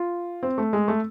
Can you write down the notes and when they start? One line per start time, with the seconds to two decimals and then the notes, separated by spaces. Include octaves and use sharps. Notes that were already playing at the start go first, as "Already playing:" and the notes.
Already playing: F4
0.43 C4
0.58 A3
0.73 G#3
0.88 A3